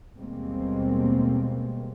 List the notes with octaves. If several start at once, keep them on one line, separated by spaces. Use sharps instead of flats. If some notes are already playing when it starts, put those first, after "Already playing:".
D#2 B2 G3 G#3 A#3 C4